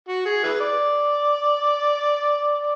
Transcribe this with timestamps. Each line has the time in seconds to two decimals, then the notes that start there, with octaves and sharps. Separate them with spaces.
0.08 F#4
0.26 G#4
0.44 E4 G#4 B4
0.60 D5